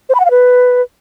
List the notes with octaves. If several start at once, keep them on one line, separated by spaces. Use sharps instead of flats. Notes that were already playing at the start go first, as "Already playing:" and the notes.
C5
B5
F#5
F5
B4